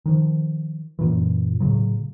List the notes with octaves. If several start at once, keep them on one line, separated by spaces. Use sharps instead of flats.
D#3 F3
F#2 A#2 E3
A2 C#3 F#3